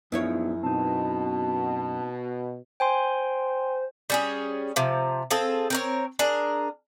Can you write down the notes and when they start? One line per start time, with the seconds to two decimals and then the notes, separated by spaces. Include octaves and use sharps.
0.12 A#1 F#2 B3 D#4 E4 C#5
0.63 B2 C4 D#4 A5
2.80 C5 G5 G#5 C6
4.10 G3 C#4 G#4
4.76 C3 F3
5.31 C4 F4 G#4 A4
5.70 C4 A#4 C#5
6.19 D4 G#4 A#4